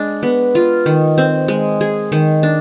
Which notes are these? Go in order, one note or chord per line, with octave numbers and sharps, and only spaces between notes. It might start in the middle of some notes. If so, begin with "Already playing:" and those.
Already playing: G#3 D4
B3
F4
D#3
C4
G#3
G#4
D#3
D4